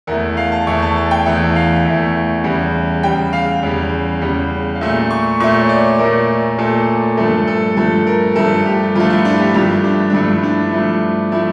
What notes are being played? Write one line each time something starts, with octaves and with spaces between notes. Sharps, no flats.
E2 E3 A3 A#4
F5
A5
E2 E3 A3 C#6
A5
A5
G5
E2 E3 A3 E5
F5
E2 E3 A3
E2 C#3 G3
E2 C#3 G3 G5
F5
E2 C#3 G3
E2 C#3 G3
F5
A#2 A3 E5
C#6
A#2 A3 C#6
C#5
D5
A#2 A3 A#4
A#2 A3 A4
G2 F3 A3 A4
A4
G2 F3 A3 A4
A#4
G2 F3 A3 A4
G4
G2 F3 A3 F4
E4
D4
G4
G2 F3 A3 G4
D4
D4
G2 F3 A3 E4
D4
G2 F3 A3
F3 A3 E4